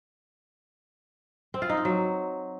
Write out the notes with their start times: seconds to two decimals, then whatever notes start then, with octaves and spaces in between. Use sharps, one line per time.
1.54 C4
1.62 F4
1.69 D#4
1.77 F4
1.85 F#3